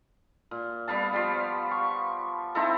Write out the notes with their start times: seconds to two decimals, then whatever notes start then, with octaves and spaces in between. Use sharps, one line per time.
0.51 A#2
0.88 G3 B3 F5 A5
1.13 F3 G3
1.71 C#6
2.55 C4 D#4 E4 A4